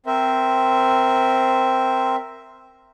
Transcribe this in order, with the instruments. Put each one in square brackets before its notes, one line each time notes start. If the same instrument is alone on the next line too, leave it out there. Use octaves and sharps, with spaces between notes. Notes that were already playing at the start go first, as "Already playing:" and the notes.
[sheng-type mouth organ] C4 A#4 C5 E5